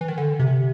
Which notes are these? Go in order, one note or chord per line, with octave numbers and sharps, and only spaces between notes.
E3
D#3
D3
C3